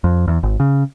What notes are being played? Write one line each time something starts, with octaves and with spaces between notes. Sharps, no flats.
F2
E2
G#1
C#3